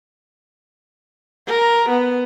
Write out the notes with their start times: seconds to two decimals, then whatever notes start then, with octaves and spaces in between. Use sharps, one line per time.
1.47 A#4
1.89 B3